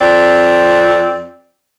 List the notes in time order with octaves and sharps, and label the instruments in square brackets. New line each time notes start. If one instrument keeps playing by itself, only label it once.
[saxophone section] F2 C4 D5